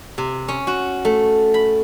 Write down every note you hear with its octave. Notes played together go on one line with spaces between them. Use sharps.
C3
C#4
F#4
A3
B5